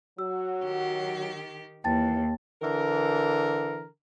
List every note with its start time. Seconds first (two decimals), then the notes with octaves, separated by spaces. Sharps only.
0.18 F#3 F#4 E6
0.64 D#3 G4
1.84 D#2 E3 G5 A5 A6
2.62 D3 E3 A#4